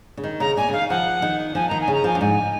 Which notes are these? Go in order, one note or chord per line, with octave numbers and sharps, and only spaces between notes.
C#3
D#3
C#3 A#5
A#2 G#5
C#3
D#3 F5
F3 F#5
D#3
F3 G#5
D#3 A#5
G#5
C#3
A#5
F3 G#5
F#2
G#2 G#5